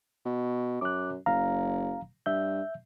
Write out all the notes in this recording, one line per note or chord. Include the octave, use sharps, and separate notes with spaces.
B2
F#2 D6 F#6
F#1 F5 A#5
G2 E5 G6